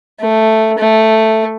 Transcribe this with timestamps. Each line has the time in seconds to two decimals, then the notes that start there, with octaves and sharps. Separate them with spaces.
0.20 A3
0.78 A3